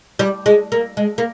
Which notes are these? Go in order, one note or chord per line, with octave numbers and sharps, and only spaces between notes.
G3
G#3
A#3
G#3
A#3